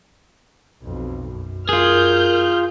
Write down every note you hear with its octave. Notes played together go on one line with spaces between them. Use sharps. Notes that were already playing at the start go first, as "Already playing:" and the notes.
B1 F2
F#2
F4 G#4 A#4 F6 G6